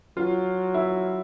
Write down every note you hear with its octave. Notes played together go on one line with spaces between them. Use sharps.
F#3 F4
E4